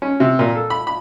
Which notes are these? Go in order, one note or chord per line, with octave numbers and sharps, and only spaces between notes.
C#4
C3
A#2
A4
B5
B5